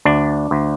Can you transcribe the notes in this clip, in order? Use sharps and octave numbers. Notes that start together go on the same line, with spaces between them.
D2 D4
D2